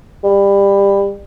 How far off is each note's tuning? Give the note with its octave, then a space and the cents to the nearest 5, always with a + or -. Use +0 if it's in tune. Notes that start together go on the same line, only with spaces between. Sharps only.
G3 +20